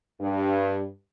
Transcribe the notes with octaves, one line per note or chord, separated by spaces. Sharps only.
G2